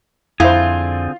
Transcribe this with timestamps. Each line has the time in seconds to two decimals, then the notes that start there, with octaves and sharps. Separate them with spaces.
0.40 F2 D3 C4 E4 F4 G#4 C5